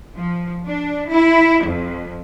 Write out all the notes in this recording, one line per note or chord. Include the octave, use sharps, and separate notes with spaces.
F3
D4
E4
F2